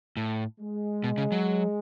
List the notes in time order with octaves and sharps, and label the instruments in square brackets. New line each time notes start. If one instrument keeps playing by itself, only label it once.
[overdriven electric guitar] A2
[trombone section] G#3
[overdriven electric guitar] B2
C#3
F#3